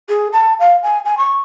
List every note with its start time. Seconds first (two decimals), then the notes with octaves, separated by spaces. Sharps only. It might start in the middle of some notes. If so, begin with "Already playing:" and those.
0.09 G#4
0.32 A5
0.59 F5
0.83 G#5
1.05 G#5
1.17 C#6